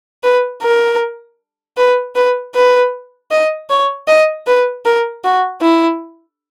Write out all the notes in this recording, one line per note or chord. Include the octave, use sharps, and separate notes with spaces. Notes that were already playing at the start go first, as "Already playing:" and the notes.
B4
A#4
B4
B4
B4
D#5
C#5
D#5
B4
A#4
F#4
E4